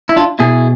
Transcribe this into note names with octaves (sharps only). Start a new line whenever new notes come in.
E4
D4 F4
B2 E4 G#4